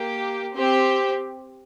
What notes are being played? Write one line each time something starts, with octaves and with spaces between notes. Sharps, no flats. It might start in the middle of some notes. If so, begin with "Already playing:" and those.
Already playing: A#3 G4
C4 G4